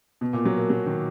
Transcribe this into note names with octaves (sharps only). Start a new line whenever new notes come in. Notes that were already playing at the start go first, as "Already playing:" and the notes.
B2
A#2
F#3
A#3
F#3
D#3